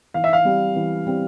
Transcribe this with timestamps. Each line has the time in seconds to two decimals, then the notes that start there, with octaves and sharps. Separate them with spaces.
0.14 E3 F5
0.24 E5
0.33 F5
0.45 G3 C4 G4
0.75 E3
1.07 G3 C4 G4